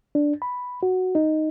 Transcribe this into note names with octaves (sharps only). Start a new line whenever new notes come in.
D4
B5
F#4
D#4